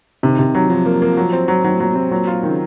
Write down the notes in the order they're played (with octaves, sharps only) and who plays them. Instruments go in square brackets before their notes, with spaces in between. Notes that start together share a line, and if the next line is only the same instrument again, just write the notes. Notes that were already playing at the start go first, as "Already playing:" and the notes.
[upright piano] C3 [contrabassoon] D#3
[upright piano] C3
F#3
[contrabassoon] F3 [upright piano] F#3
[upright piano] A#3
A#3
F#3
C4
F#3
[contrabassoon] D#3 [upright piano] F#3
[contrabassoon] A2
[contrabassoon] A#2 [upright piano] F#3
[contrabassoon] A#2
[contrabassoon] C3 [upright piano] C4
[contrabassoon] A#2 [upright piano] F#3
[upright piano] F4
D#3
[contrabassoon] C#3